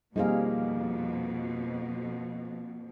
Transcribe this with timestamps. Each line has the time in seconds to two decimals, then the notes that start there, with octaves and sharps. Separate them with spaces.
0.16 F2 B2 G3 A#3 C4 D#4 G#4 F5